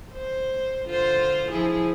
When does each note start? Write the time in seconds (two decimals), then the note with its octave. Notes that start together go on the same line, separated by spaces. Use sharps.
0.13 C5
0.86 D3 F4 C5
1.51 F3 E4 G#4